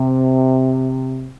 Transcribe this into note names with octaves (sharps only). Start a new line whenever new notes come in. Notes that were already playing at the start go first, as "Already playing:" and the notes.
Already playing: C3